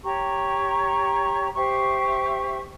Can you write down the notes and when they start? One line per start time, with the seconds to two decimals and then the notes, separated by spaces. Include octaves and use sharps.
0.04 G4 C#5 A#5 C#6
1.54 G4 C5 E5 C#6